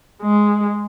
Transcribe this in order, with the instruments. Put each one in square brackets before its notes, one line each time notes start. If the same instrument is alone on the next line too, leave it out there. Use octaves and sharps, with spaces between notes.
[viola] G#3